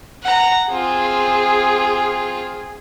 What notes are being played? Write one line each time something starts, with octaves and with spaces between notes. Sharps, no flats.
F#5 A#5
C4 F4 G#4